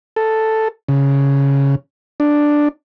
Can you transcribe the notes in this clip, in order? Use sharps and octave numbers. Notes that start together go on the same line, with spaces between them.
A4
C#3
D4